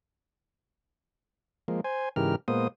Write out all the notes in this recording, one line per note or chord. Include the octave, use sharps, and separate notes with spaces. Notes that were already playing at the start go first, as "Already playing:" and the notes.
F3 G#3 A#3
C5 G#5
G#2 C#3 E3 G4 A#4 F6
A#2 G#3 A#3 B3 C5 D#6